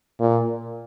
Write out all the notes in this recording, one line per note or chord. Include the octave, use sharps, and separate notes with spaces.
A#2